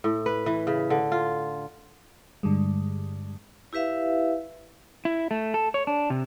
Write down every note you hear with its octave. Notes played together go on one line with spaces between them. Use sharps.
A2
B4
E3
C#3
D3
F4
G2 D3 G3 G#3
E4 G4 B4 E5 F5
E4
A3
A4
C#5
D4
C3